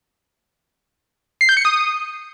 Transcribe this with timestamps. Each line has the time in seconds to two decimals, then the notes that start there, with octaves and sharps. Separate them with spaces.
1.41 C7
1.49 G6
1.57 C#7
1.65 D#6